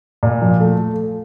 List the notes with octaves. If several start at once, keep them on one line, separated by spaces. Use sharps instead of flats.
A#2
F3
A3